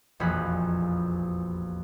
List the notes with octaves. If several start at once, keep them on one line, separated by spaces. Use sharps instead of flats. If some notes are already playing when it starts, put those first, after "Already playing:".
E1 A#1 F2 G#4 B5 F#6